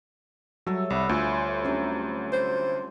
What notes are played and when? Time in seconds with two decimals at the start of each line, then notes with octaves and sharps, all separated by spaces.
0.67 F#3 G3 A4 C#5 E5
0.90 C2 B4 E5 F#5
1.09 D2 A3 F4 C#5 G#5 C6
1.65 C3 F#3 C#4 D4
2.33 C5